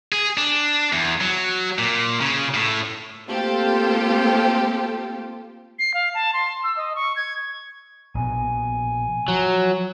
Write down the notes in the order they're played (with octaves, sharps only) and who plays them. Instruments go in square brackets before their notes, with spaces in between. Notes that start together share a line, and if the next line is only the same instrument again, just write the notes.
[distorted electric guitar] G#4
D4
E2
F#3
A#2
C#3
A2
[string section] A3 A#3 C4 F4 G4 A4
[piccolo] C7
F5
A5
C6
E6
D#5
C#6
G#6
[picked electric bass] A#1 B2 [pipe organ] G#5
[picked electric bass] F3 [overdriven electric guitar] F#3